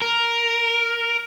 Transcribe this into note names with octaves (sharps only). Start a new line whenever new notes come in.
A#4